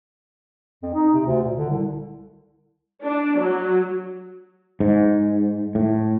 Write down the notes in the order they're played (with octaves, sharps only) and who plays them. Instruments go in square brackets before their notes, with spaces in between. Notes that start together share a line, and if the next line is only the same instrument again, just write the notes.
[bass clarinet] F2
D#4
C3
D2
A#2
D3
C2
[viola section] D4
F#3
[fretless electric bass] G#2
A2